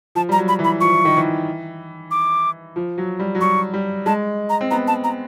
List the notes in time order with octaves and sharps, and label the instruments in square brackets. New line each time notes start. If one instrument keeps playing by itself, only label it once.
[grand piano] F3 [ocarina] A5
[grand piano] G3 [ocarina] A#5
[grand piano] F#3
[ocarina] B5
[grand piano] E3
[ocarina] B5
[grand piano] F3 [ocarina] C#6
[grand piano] E3
D#3
E3
[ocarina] D6
[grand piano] F3
F#3
G3
F#3
[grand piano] G3 [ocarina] C#6
[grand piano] G3
[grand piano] G#3 [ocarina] A5
[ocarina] A#5
[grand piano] C4
[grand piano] B3 [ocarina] A#5
[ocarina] A5
A#5